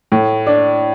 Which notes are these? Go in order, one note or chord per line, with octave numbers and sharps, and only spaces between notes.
A2
D4